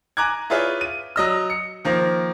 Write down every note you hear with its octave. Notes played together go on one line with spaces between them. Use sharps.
G#5 A#5 D6 F#6 G#6
E4 F4 G#4 B4 C#5
D#7
F#3 D#5 E6
C#7
D#3 F3 A#3